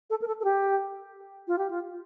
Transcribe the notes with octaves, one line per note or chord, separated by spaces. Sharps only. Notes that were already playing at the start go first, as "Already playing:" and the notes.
A4
A#4
A4
A4
G4
F4
G4
F4